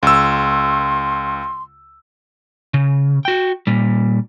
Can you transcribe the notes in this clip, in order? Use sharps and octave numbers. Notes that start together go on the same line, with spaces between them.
C#2 C6 E6
C#3
F#4 G5
A#2 G3